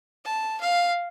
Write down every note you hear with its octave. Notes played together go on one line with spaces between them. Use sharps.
A5
F5